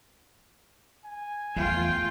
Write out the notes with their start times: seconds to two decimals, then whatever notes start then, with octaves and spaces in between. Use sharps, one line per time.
1.05 G#5
1.56 E2 A3 F4 G5